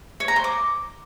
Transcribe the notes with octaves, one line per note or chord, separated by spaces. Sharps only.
C#5
A#5
C5
D6